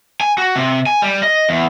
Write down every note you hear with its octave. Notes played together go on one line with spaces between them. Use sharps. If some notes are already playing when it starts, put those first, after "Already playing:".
G#5
F#4
C3
G#5
G3
D#5
E2